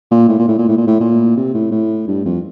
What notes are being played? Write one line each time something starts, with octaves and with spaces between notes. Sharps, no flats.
A#2
A2
A#2
A2
A#2
A2
A#2
A2
A#2
C3
A2
A2
G2
F2